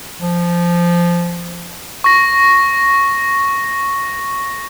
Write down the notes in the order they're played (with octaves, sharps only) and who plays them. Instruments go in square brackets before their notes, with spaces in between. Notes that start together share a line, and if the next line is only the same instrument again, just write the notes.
[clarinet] F3
[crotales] C#6 A#6